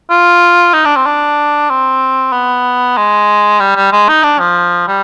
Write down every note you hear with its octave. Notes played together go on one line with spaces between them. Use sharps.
F4
D#4
D4
C4
D4
C4
B3
G#3
G3
G3
G#3
D#4
D4
F3
G3